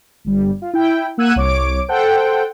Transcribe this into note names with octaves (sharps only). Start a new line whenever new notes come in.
G1 G3
F4
E4 G5
A#3 F#5 E6 F#6 G#6 D#7
C2 C#5 D6 D7
A4 C5 F#5 G5